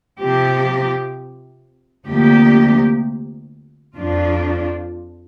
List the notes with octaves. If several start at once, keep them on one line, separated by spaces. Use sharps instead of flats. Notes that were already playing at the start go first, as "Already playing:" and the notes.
C3 F3 C4 G4
D2 C3 F3 A#3 G4
F2 F3 D4 F4